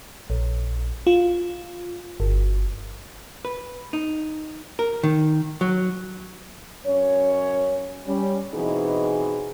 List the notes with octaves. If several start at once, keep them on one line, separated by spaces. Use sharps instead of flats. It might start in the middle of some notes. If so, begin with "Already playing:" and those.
A#1
F4
G1
B4
D#4
A#4
D#3
F#3
F#2 C#4 C#5
G3 C#4
B2 E3 C4 D#4 G#4